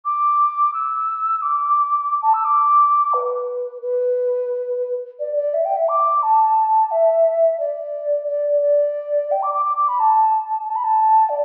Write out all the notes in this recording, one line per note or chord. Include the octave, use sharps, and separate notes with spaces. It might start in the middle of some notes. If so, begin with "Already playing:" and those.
D6
E6
D6
A5
E6
D6
B4
B4
D5
D5
E5
G5
E5
D6
A5
E5
D5
D5
D5
G5
D6
D6
D6
D6
B5
A5
A5
B5
A5
D5